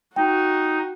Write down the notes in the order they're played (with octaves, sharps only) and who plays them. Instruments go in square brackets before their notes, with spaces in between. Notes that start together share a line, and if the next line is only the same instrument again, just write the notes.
[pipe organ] D#4 [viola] F#4 [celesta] G5